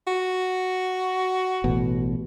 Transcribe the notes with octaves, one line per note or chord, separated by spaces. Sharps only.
F#4
A1 B2